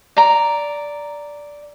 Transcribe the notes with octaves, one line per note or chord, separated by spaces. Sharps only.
D5 A#5